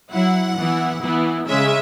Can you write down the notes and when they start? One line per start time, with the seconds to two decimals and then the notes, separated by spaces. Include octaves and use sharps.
0.13 F#3 E4 F#5
0.58 E3 B3 E4
1.02 E3 B3 E4
1.47 C#3 G#3 C#4 E5